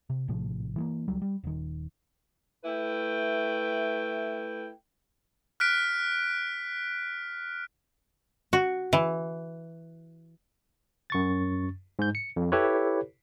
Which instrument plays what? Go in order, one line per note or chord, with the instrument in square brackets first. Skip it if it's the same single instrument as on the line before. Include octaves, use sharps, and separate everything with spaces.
[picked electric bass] C3
A#1 A2 C3 F3
E3 G#3 A#3
C#2 F#3 G3
G3
D#1 D#3
[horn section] A3 E4 B4 G5
[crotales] F6 F#6 B6 D7
[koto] F#4
E3
[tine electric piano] F#2 C#6 A6
G#2 G6
C#7
F2
E4 G4 A4 B4 C#5